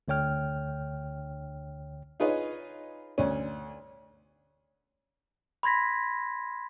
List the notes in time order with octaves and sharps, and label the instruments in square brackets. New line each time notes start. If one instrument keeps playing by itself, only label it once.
[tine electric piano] D2 D3 C#5 G5 F6
[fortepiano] D#4 F4 G#4 B4 C#5 D#5
D2 C#4
[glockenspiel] B5 C6 G#6 A#6 B6